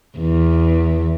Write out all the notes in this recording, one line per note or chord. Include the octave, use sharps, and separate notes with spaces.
E2